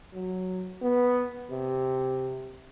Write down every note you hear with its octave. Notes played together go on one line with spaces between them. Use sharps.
F#3
B3
C3